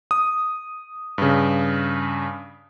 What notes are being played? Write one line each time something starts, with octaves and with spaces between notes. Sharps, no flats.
D#6
G2 C#3